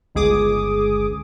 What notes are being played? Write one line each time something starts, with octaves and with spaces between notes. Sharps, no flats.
G1 C#2 G#4 D6 D#6